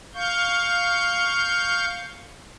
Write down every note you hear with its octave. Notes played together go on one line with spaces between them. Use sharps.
F5 C#6 G6